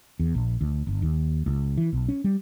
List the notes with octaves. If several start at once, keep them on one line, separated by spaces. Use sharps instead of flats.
E2
A#1
D2
G1
D#2
C#2
E3
B1
C#4
G3